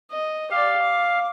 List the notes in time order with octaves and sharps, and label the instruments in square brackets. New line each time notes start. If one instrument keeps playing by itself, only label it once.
[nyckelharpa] D#5
[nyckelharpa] G4 D5 [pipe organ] F5
[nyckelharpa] D6